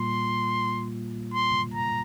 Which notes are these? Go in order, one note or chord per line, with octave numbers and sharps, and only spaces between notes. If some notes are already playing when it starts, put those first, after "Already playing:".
Already playing: A#2 G3 A#3 F4 C6
C6
A#5